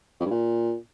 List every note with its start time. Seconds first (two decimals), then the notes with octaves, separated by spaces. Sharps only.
0.20 F2
0.26 G2
0.31 A#2